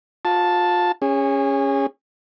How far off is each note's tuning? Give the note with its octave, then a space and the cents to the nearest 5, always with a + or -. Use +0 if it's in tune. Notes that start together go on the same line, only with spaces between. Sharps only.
F4 +30 A5 +0
C#4 +0 G#4 -30